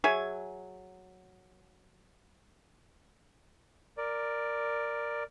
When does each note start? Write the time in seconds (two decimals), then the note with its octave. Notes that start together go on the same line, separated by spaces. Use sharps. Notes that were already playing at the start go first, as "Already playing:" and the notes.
0.04 F#3 G#4 E5 G#5
3.97 A#4 D5